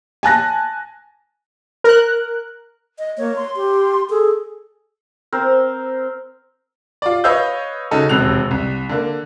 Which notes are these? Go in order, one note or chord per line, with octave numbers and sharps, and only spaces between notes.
G#5 A5 F#6 A#6
A#4 F#6
D#5
A#3 C#5
C6
G4
G#4 A4
C4 A#4 C5
F4 D5
B4 C#5 D#5 F5 E6 G6
C#3 C#4 D#4 F#4 A4
E1 D#2 C3 F#6 F7
C2
D3 A#3